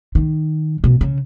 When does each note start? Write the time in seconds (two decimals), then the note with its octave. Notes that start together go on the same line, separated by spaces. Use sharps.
0.15 D#3
0.84 B2
1.01 C#3